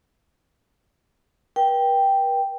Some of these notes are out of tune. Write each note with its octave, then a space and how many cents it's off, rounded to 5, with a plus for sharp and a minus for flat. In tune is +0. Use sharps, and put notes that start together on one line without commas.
B4 -45 G5 +0